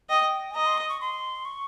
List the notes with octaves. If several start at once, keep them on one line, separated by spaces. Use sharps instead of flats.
D#5 G5
G#5
D#5 A#5
C6
D#6
C#6
C6
C#6